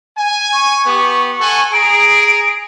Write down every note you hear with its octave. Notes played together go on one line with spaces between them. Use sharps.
G#5
C#6
B3 G4
A4 F#5 G#5
G#4 A#5 D7